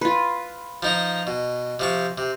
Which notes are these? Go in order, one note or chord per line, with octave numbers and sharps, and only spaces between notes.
F4 B4
F3 D#4 A#5
B2
C3 F3 C#6
C3